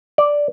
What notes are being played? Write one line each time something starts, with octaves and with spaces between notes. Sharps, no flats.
D5